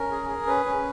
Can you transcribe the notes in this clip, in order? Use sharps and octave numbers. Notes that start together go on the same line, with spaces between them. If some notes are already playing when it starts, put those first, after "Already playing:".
Already playing: C#4 A#4
G#4
G#4
C#4 B4
C#4